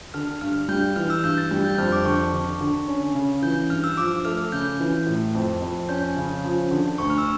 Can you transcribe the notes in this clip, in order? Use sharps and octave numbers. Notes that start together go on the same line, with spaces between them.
D3 F6
G2 F6
G3 G6
E3 F6
E6
G2 G6
A6
G3
G6
F2 F6
D6
D3 C#6
D3
D3
C#4
C#3
E3 G6
G2 F6
E6
F3 D6
A3 F6
C#3 G6
E3
A2
F2
F2
C#4 G6
C#3
F3
D3
D2 C#6
F6
E6